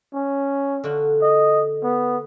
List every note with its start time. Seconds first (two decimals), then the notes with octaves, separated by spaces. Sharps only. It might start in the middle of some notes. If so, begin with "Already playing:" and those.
0.14 C#4
0.84 D3 F4 F#4
1.22 D#5
1.84 B3